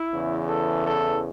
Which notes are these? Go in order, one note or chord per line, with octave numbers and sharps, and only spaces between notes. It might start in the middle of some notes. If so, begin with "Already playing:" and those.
Already playing: E4
E2 C#3 E3
A4
A4